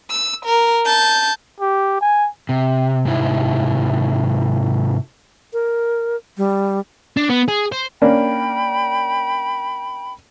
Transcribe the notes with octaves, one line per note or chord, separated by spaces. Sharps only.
E6
A#4
A5 G6
G4
G#5
C3
G#2 C3 D#4 E4
A#4
G3
D4
B3
G#4
C5
A#3 C#4 D4 G5 B5